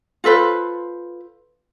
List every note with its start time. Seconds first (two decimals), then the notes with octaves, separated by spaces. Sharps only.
0.24 F4 A4 B4 C5